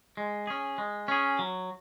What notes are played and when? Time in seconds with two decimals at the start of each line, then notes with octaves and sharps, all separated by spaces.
0.17 G#3
0.47 C#4 G#4
0.78 G#3
1.08 C#4 G#4
1.39 F#3